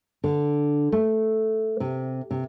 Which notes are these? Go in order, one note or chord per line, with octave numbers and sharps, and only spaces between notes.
D3
A3
C3
C3